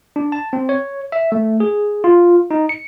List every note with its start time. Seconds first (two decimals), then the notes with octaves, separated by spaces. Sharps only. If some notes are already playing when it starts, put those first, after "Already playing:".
0.16 D4
0.32 A5
0.53 C4
0.69 C#5
1.12 E5
1.32 A3
1.60 G#4
2.04 F4
2.51 D#4
2.69 C#7